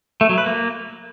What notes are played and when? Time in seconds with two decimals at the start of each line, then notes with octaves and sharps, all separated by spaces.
0.21 A3
0.29 F#3
0.38 B4
0.46 A#3